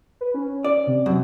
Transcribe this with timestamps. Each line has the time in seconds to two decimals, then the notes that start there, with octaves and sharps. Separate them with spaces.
0.21 B4
0.34 C#4
0.64 D5
0.87 C3
1.06 F#2